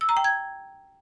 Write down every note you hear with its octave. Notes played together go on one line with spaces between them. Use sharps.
E6
A#5
G5
G#6